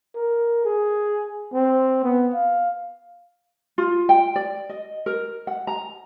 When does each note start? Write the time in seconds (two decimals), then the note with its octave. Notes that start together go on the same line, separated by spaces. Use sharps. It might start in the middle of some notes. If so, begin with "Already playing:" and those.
0.15 A#4
0.65 G#4
1.53 C4
2.03 B3
2.34 F5
3.78 F4
4.09 G5
4.36 D5
4.69 D#5
5.06 A#4
5.47 F#5
5.67 A#5